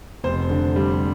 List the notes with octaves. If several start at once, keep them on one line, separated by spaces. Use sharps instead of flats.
F1 C5
D3
G3